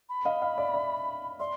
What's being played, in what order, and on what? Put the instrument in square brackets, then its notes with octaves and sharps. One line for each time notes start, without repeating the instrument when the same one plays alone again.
[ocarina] B5
[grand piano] D#5 F5
D#5 F5
D5 E5
D5 E5
[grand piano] D5 E5 [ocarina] C6